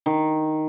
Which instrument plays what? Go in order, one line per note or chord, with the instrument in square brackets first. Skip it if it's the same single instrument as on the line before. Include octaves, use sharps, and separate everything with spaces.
[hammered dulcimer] D#3